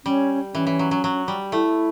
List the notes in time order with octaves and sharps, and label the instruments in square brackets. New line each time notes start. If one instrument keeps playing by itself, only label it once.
[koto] G3 [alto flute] C#4
[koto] E3 [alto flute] C#4
[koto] E3
F#3
F#3
F#3
G3
[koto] A3 [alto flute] E4